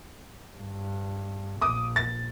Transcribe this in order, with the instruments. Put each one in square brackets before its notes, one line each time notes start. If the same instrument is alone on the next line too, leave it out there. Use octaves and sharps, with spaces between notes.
[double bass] G2
[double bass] A#1 [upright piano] D6 D#6
[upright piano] A6